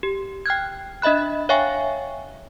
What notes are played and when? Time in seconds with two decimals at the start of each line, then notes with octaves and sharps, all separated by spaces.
0.03 G4
0.46 G5 F6 F#6 G#6
1.02 D4 D#5 E5 B5 F#6
1.49 C#5 E5 F5 G5 G#5 C#6